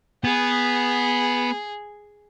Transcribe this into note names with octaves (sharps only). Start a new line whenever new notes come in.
B3 G#4